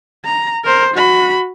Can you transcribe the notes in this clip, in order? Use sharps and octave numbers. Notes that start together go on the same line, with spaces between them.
A#5
A#4 C5
F#4 B5